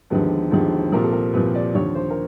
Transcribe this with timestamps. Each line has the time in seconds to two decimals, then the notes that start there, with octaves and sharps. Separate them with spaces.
0.10 E1 D#2 D3 F3 B4
0.51 E1 D#2 D3 F3
0.92 C2 A#2 F3 A#4
1.04 A4
1.13 A#4
1.33 C2 A#2 F3 B4
1.55 D5
1.74 D#2 D3 F3 C#5
1.95 C5
2.10 A#4